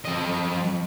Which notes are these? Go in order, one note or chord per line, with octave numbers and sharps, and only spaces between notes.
F2 D#5